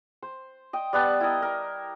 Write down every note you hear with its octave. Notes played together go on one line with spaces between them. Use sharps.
C5
D#5 G5
G3 B3 B4 A5
E4 A#4 D#5
A#4